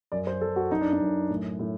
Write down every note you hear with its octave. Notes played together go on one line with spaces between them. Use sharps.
F#2 D5
C5
F#2 A4
F#4
F#2 D#4
D4
D#4
F#2
A2
A2